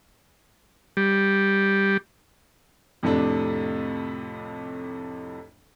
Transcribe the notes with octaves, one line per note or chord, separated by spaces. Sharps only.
G3
F2 A2 C3 A3 D4